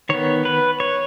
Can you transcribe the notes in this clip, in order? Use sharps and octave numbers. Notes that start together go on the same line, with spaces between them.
D#3 B3 C#5
B4
C#5